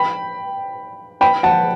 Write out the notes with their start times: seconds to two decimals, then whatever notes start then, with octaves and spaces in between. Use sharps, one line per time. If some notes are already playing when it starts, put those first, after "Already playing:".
Already playing: G5 B5
1.21 G5 B5
1.43 F#5 A5